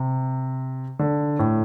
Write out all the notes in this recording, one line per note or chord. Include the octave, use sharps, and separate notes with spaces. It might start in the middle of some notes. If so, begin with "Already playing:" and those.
Already playing: C3
D3
A2